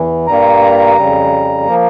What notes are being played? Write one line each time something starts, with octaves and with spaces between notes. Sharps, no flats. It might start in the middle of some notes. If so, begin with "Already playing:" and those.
Already playing: E2 E3
G2 G3 A#3 A#5
F2 C#3 G3
F3 A#3